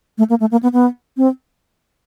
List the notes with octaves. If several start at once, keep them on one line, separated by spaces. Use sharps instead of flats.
A3
A#3
A3
A#3
B3
B3
C4